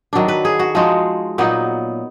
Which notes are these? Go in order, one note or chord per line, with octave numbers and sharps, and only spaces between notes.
D#3 F#3 D4
B4
G#4
F#4
F3 G#3 D#4 F#4
A#2 F#3 B3 D#4